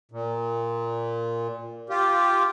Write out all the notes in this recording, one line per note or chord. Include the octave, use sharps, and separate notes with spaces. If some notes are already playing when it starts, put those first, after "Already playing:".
A#2
F4 G4